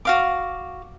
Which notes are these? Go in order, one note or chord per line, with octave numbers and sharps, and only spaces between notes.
F#4 F5 D6